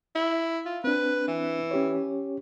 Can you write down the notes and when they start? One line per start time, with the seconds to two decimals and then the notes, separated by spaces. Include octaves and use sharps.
0.16 E4
0.66 F4
0.84 C4 D4 B4
1.28 E3
1.71 C#4 G4 C#5